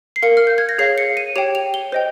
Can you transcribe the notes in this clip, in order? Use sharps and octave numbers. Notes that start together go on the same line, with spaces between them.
C7
A#4 F5 C#7
F6
G6
G#6
A#6
G#4 C#5 F5 C7
C#7
D#7
G4 C#5 G5 F7
F7
G7
C5 D#5 G5